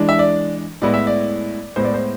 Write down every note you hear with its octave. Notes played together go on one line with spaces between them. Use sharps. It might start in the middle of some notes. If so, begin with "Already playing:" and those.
Already playing: E3 G#3 D4
E5
D5
A2 G#3 B3 E4 D5
E5
D5
A2 G#3 B3 E4 C5
D5
C5